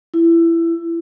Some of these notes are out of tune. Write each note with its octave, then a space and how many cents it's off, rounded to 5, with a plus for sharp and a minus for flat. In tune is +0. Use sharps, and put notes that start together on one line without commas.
E4 +20